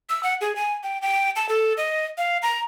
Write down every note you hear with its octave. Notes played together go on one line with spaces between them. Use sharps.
E6
F#5
G#4
G#5
G5
G5
A5
A4
D#5
F5
A#5